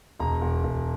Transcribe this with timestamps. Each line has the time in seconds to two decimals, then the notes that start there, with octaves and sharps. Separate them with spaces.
0.19 E1 A#5
0.41 E1
0.64 E1